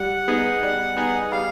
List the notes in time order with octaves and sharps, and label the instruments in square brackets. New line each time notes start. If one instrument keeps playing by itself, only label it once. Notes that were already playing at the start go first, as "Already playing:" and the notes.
Already playing: [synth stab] G3 [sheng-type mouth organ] F#5
[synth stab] B3 D#4 G#4
G3
B3 D#4 G#4
[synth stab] G3 [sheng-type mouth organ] F5